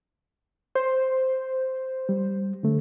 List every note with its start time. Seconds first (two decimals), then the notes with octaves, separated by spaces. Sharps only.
0.75 C5
2.09 G3
2.63 D3 A3